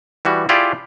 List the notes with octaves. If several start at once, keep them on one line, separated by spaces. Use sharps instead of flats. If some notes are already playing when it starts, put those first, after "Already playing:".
E3 G3 F#4
E4 F4 G4 G#4 D5